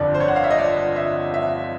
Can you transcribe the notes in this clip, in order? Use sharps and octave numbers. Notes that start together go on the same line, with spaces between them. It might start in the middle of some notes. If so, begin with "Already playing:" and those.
Already playing: G1 F2 D3 D5
C5
C#5
F#5
F5
E5
D#5
D5
E5
E5